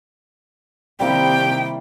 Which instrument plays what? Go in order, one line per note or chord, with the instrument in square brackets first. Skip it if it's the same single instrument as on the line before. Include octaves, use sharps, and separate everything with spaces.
[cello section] C3 D#3 [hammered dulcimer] G3 A#3 E4 [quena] G5